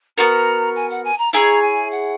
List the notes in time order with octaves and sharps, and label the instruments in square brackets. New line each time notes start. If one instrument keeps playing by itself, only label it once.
[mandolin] B3 F#4 A#4 [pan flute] A#5
[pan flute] G#5
F#5
G#5
A#5
[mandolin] E4 G#4 C#5 [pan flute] A#5
[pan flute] G#5
F#5